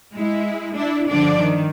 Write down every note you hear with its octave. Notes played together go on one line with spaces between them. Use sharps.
G#3 E4
D4 E4
G2 D3 F3 D4 D5
D#3